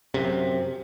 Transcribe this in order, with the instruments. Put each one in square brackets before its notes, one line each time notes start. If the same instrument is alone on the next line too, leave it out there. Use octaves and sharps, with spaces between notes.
[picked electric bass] F#2 C3